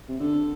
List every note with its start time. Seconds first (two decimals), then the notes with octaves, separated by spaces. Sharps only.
0.08 C3
0.20 D3 A4